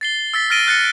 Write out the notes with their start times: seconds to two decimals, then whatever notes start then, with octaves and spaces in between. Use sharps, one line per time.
0.01 A6 C7 G7
0.34 E6 A6 B6
0.50 F6 A6 A#6 D7 D#7 G7
0.67 F6 F#6 A6 C#7